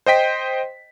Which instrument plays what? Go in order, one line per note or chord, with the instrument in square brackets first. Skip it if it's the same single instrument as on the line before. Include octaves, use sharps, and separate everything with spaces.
[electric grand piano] C5 D#5 G5 B6